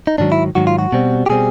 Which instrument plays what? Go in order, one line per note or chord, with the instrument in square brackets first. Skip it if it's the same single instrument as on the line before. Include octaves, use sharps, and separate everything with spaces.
[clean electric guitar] D#4
G#2 D#3 F#3 D4
E4
G#2 D#3 F#3 F#4
F4
F#4
B2 G3 C4
G4
B2 G3 C4 G#4